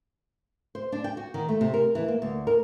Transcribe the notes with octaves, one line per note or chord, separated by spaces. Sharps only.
C5
D4
G5
F#4
D#3
A3
C3
A#4
E3
A#3
D2
A#4